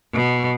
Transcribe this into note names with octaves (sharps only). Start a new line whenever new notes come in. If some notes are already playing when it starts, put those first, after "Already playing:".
B2